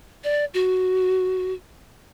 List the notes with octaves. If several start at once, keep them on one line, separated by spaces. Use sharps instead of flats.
D5
F#4